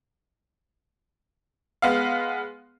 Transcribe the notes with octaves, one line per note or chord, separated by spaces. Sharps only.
G#3 B3 F5